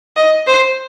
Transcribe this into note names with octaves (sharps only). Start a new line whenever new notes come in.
D#5
C5